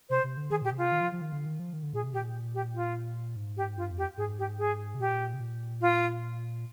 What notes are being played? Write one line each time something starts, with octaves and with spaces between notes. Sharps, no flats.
C3 C5
C3
D3
D#3 G#4
A#2 G4
C3
F4
D#3
F3
F3
D#3
D3
D#3
F3
D#3
D3
A#2 G#4
C3
A#2 G4
G4
F4
G#2
G4
G2 F4
F2
G4
G#2 G#4
G4
G#4
C3
A#2 G4
C3
A#2
F4